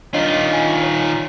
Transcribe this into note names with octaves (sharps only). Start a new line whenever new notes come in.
D#3 D4 F4 C#5 D#5
D#5
G#5
C#5